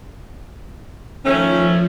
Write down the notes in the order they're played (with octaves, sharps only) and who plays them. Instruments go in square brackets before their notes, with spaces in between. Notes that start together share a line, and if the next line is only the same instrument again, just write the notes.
[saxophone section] D#3 A3 C#4 [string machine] F3